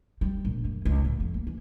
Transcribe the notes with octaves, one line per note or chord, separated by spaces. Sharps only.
G3
A#1
F#2
C#2
A1
F2
A#3
E3